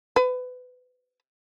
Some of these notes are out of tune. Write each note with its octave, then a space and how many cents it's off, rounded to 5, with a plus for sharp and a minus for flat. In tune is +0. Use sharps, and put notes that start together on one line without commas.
B4 +25